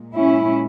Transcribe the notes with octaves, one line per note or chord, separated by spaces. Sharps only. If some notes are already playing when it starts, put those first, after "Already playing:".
Already playing: A#2 G#3
C#4 E4